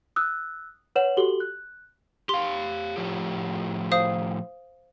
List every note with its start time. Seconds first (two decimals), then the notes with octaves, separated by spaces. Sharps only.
0.16 D#6 E6 F#6
0.96 B4 C#5 F#5 E7 F#7
1.17 F#4 G4 A4 F#7 G7
1.40 F#6
2.29 G4 F5 C6
2.97 A2 F3 G4
3.92 C5 F5 D#6